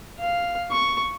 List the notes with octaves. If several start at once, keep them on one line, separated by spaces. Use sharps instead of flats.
F5
C#6